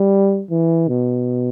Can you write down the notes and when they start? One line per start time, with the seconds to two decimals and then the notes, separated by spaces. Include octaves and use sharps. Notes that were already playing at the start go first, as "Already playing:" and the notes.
Already playing: G3
0.51 E3
0.88 B2